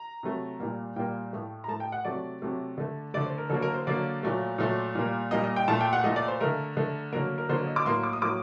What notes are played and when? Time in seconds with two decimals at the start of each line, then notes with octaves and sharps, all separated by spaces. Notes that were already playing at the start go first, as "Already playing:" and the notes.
Already playing: A#5
0.23 C3 F#3 A3
0.60 A#2 G3 A#3
0.96 A#2 G3 A#3 G5
1.33 A2 A3
1.64 A#5
1.68 A2 A3 A5
1.80 G5
1.92 F#5
2.05 C3 F#3 A3 D5
2.42 C3 F#3 A3
2.78 D3 A3
3.14 D3 A3 D5
3.26 C5
3.38 A#4
3.50 D3 F#3 A#3 A4
3.62 A#4
3.74 C5
3.87 D3 F#3 A#3 D5
4.23 A#2 F#3 A3
4.58 A#2 F#3 A3
4.95 A#2 G3 A#3
5.31 A#2 G3 A#3 D#5
5.44 D#5
5.56 G5
5.68 A#2 A3 A5
5.81 G5
5.93 F#5
6.04 A#2 A3 D#5
6.16 D5
6.28 C5
6.41 D3 A3 A#4
6.77 D3 A3
7.13 D3 F#3 A#3 A#4
7.38 A#4
7.49 D3 F#3 A#3 C5
7.67 D#5
7.76 D6
7.86 A2 F#3 A#3 C6
8.03 D6
8.13 D#6
8.22 A2 F#3 A#3 D6